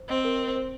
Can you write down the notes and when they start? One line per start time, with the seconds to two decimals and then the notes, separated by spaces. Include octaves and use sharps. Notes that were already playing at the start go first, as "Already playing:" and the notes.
Already playing: C5
0.08 C4 D#5
0.25 A#4
0.41 A#4
0.56 C5